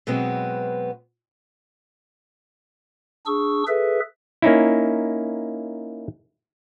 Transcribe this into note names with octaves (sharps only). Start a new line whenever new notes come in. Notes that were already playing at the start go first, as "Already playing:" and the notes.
B2 F#3 G#3 B3 C4
D4 G#4 C#6 E6
G#4 A4 B4 E5
A#3 C#4 D#4 E4